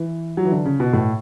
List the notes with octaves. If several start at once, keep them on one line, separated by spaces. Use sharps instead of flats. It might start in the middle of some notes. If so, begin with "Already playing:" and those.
Already playing: E3
F#3
E3
D3
C#3
B2
A2